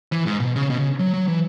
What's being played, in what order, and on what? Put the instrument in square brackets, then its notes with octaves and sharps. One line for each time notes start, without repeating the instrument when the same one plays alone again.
[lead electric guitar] E3
G#2
B2
C#3
B2
C#3
F#3
F#3
E3